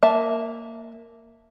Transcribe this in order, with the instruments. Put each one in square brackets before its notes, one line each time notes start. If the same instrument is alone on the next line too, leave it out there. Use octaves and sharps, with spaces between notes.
[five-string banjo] A#3 E5 A5